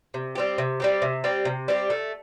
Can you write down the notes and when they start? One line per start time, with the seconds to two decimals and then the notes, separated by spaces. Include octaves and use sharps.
0.14 C3
0.35 G3 C4 G4
0.58 C3
0.80 G3 C4 G4
1.02 C3
1.24 G3 C4 G4
1.45 C3
1.68 G3 C4 G4
1.90 A3